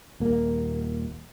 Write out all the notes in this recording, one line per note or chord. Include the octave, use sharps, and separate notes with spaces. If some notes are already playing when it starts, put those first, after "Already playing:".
D#1 A#3